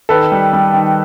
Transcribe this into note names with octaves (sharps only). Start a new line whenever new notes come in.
D#3 A4 B4
G3
G3
D#3